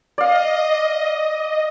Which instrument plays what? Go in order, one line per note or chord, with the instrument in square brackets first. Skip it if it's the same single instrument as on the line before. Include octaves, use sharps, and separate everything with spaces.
[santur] D5 F5 [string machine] D#5